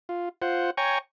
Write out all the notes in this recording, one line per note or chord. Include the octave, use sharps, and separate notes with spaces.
F4
F4 C5 F#5
C#5 G5 G#5 A#5 C#6